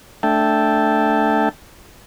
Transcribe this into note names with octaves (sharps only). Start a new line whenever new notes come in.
A3 D4 E5 G5 A5